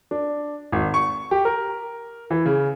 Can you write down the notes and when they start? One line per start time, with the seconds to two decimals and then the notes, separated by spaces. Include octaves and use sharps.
0.11 D4
0.72 G#1
0.94 C#6
1.31 G4
1.45 A#4
2.30 E3
2.45 C#3